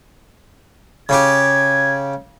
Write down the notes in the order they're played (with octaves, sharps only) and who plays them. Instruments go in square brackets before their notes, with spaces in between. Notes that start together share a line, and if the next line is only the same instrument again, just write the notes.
[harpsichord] C#3 G4 [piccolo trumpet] G#6